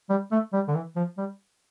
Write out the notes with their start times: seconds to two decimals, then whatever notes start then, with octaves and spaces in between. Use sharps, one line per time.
0.09 G3
0.31 A3
0.53 G3
0.68 D3
0.75 E3
0.96 F3
1.18 G3